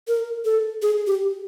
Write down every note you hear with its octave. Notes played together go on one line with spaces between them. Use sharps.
A#4
A4
G#4
G4